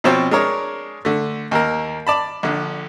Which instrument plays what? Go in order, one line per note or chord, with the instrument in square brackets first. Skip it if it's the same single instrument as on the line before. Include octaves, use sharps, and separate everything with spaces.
[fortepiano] B2 F3 C4 C5 C#5 G5
G#3 D4 A#4 C#5
D3 A3
D#2 A#3 A#4
D5 A5 B5
A#1 D3